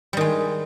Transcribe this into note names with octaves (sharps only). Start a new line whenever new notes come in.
D#3 G3 G#3